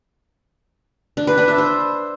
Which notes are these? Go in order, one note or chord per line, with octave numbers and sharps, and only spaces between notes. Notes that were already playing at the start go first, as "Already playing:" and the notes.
D4
B4
D4
E5
C5